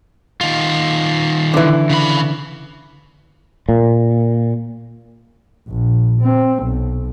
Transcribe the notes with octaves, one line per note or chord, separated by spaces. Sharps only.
D#3 F4
D3 E3
C#3 B5
A#2
A#1
C4
B1